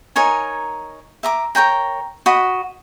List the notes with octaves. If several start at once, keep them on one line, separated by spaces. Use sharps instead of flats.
D#4 A#4 C#5 G#5
E5 A#5 D6
A#4 C#5 G5 A#5
F#4 D#5 B5